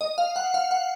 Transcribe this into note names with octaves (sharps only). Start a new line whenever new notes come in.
D#5
F5
F#5
F5
F#5